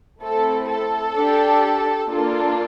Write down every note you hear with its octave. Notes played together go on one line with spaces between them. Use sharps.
A3 C4 E4 A4
A4
D4 G4
A#3 D4 F4 A4